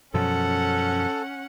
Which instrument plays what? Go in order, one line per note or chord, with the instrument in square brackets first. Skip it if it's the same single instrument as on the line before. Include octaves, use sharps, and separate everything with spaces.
[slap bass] F#2 B2 F3 [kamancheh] C#4 F#5 [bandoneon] A4